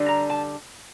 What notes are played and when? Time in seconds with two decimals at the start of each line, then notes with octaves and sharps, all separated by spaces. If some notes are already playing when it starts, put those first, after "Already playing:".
Already playing: D3 G3 D4
0.08 A#5
0.30 A5